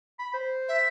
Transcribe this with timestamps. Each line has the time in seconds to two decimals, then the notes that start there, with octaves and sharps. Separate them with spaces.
0.19 B5
0.34 C5
0.69 E5